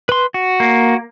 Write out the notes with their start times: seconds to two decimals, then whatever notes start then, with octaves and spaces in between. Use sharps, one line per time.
0.09 B4 C6
0.34 F#4
0.60 A#3